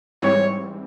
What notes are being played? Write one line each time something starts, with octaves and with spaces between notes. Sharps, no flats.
G#2 E3 G3 C4 C#5